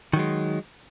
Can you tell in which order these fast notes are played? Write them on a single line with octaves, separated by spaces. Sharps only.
D#3 F#3 G#3